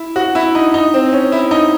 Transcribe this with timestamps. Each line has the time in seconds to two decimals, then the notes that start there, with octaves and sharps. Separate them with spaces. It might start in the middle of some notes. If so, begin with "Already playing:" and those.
Already playing: E4
0.16 F#4
0.35 E4
0.55 D#4
0.74 D#4
0.94 C4
1.13 C#4
1.32 E4
1.51 D#4